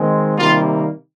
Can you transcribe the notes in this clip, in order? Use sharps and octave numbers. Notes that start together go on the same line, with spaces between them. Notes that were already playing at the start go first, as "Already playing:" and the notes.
Already playing: D#3 G#3 C4
C3 D#3 G3 A#3 F4